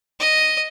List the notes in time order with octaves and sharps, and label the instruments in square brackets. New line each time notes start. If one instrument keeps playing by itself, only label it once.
[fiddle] D#5